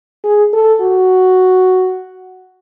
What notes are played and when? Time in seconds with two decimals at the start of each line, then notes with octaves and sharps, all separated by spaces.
0.24 G#4
0.53 A4
0.81 F#4